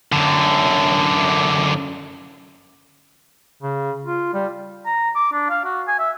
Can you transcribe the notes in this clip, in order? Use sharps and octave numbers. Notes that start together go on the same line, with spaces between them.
F#2 D3
C#3
F4
G3
A#5
D6
D4
F5
F#4
G#5
E5